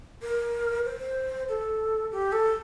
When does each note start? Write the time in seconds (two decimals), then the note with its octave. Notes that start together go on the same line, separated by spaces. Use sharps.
0.22 A#4
0.85 C5
1.48 A4
2.12 G4
2.32 A4